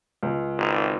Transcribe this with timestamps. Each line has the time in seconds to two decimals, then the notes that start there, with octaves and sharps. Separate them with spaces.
0.23 C#2
0.58 G#1